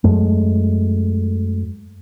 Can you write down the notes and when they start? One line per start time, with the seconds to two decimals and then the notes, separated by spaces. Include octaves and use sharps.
0.04 F#2 G#3 A3